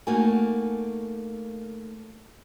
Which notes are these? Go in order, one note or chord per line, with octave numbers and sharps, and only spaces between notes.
A3 A#3 D#4 F#4 A#4 G#5